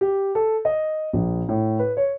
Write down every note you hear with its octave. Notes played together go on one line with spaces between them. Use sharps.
G4
A4
D#5
A#1
A2
B4
C#5